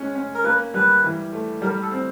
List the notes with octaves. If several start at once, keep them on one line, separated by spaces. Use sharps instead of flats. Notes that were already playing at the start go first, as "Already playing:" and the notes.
Already playing: G#3 C#4
C#4
A#4
A#3 B4
G3 B4
E3
A3
G3 A#4
A4
C4